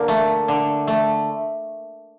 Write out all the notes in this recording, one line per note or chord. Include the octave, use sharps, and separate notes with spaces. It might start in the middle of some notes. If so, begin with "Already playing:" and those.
Already playing: D3 A#3
A3
D3
A3